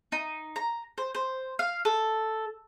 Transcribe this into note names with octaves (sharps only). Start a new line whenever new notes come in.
D#4
A#5
C5
C5
F5
A4